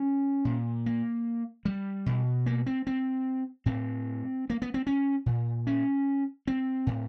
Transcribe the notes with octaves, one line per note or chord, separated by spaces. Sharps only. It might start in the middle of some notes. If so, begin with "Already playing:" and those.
Already playing: C#4
A#2
A#3
G3
B2
A#3
C4
C4
A2 C4
A#3
B3
C4
C#4
A#2
C#4
C4
A2